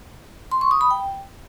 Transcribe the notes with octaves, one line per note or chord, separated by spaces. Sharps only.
C6
C#6
D#6
B5
G5